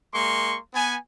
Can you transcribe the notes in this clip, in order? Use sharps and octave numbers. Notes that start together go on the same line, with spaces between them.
G#3 A#3 C6 C#6
B3 G#5